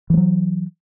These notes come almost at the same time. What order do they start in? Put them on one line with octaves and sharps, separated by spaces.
E3 G3 F#3